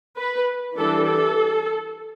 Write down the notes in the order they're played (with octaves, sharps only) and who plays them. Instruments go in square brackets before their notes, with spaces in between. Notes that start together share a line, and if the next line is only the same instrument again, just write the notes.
[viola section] B4
E3 G3 D4 A4
A4